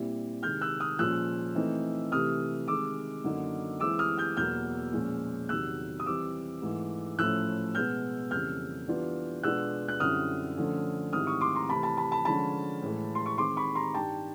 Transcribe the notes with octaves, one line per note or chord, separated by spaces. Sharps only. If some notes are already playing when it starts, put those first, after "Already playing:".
Already playing: A#2 G3 C4 E4
C3 D#3 G#3 F6 G6
E6 F#6
D#6 F6
A#2 F3 G#3 C#4 F4 E6 F#6
E3 A3 C4 D#4
C3 E3 A3 D#6 F6
C3 D#3 G#3 D6 E6
F#2 D3 F#3 A#3 D#4
E3 G#3 C4 E4 D6 E6
D#6 F6
F6 G6
E2 B2 F#3 A#3 F6 G6
A#2 F3 G#3 C#4
E2 C3 D#3 F#3 E6 F#6
D#6
E3 G3 C4 D6 E6
G#2 E3 A3
A2 F3 A3 C#4 E4 E6 F#6
B2 G#3 B3 F6 G6
F2 C#3 E3 G3 A#3 F6 G6
E3 G3 B3 D4 F4
B2 G#3 B3 D4 F4 E6 F#6
F#6
F#2 D3 G3 C4 E4 D#6 F6
D3 F3 A3 C#4
G#2 D#3 G3 C4 E4 D#6 F6
C#6 D#6
C6 D6
A#5 C6
C3 E3 A3 C4 A5 B5
A5 B5
A5 B5
A5 B5
D3 F3 G#3 C#4 A5 B5
A2 E3 G#3
C6
C#6
D#3 G#3 C4 C6 D6
B5 C#6
A#5 C6
G2 D#3 G3 G5 A5